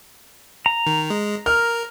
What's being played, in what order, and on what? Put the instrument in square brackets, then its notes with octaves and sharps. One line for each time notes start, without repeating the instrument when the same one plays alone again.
[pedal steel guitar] A#5
[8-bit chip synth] D#3
G#3
[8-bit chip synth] A#4 [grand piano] F6